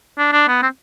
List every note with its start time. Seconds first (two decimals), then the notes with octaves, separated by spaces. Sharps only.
0.18 D4
0.33 D4
0.48 B3
0.62 C4